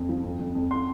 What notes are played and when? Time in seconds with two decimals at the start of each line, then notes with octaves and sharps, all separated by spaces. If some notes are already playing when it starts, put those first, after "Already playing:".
Already playing: F2
0.09 F3
0.23 F2
0.39 F2
0.55 F2
0.71 C6